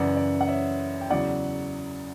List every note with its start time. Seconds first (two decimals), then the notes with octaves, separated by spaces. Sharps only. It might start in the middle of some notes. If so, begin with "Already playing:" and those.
Already playing: F#2 C#3 E3 D5 F#5
0.16 D5
0.41 F#5
0.48 C#5 E5
1.01 G5
1.10 E2 C#3 F#3 D5 F#5